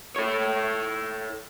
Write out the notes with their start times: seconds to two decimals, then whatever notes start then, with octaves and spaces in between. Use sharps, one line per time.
0.16 A4 C#5